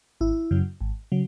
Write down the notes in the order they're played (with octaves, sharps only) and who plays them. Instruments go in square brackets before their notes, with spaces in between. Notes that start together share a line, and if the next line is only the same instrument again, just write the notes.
[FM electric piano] G#1 E4
F#2 C#3 F#3
G#1
C#3 F#3